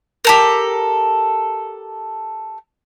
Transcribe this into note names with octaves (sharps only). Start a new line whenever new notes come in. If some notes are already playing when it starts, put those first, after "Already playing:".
G4 A4 A#4